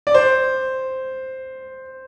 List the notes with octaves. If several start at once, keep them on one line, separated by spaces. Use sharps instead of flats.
D5
C5